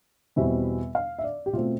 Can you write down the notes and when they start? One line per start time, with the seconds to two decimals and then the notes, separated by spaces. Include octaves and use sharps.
0.36 E2 B2 G3 C4 E5
0.95 F5
1.19 E5
1.24 D5
1.46 G4
1.53 B2 A3 C4 F4